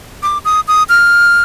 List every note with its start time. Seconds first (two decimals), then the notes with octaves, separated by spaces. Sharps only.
0.23 D6
0.45 D#6
0.68 D#6
0.89 F6